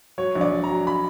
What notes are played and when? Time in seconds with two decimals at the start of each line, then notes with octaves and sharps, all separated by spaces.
0.18 F#3 C#5
0.35 A#1
0.41 D5
0.52 A#1
0.64 A#5
0.70 F#3
0.87 B5